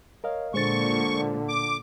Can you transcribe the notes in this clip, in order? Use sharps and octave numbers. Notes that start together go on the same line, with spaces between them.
A#4 C#5 D#5 F5
A#2 D3 G#3 C5 C#6 A6
D6